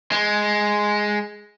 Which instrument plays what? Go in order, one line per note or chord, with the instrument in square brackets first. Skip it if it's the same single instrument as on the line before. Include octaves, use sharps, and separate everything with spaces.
[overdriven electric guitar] G#3